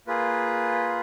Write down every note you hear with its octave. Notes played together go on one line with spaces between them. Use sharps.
A#3 F4 G#4 B4